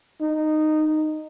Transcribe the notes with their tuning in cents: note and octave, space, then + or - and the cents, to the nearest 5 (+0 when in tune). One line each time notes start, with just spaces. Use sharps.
D#4 -10